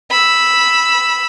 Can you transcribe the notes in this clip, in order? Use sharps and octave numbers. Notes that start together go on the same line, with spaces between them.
B5 E6